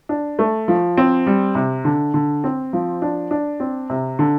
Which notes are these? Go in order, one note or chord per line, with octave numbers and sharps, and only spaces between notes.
D4
A3
F3
C4
G3
C3
D3
D3
C4
F3
D4
D4
C4
C3
D3